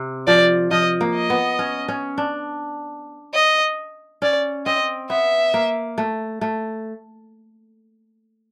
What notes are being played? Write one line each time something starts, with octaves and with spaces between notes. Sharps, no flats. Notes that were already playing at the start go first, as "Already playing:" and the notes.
Already playing: C3
F3 D5
F3 D#5
A#3
D#5
B3
C#4
C#4
D4
D#5
C#4 D5
C4 D#5
B3 E5
A#3
A3
A3